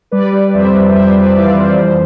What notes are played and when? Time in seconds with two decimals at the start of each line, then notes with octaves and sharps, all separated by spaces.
0.12 G3 B4 D5
0.32 G3
0.54 F2 C5 E5
0.75 G3
0.95 F2 C5 E5
1.16 F2 B4 D5
1.37 E3 D5 F5
1.58 F2 C5
1.78 E3 C5